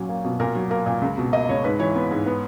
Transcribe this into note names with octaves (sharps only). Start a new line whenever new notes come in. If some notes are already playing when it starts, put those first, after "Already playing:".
Already playing: A#2 F#3 C#4
A#3
B2
A#2 A#4
F#3
A#3 A#4
A#2
C#2
B2
A#3 D#5
C#2 C#5
G#2 B4
E3 C#5
B3
G#2
B3